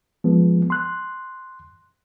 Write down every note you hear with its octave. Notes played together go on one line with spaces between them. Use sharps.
F3 G#3 B3
C6 F#6